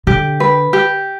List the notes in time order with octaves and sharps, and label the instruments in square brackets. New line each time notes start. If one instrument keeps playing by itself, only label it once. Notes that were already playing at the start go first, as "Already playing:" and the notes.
[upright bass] D3 [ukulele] G4
[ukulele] B4
G4